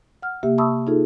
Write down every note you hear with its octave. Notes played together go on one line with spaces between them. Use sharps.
F#5 F6
C3 A#3 G4 E5
E5 A5 B5 C#6 D#6 E6
D#4 F4 G#4 A4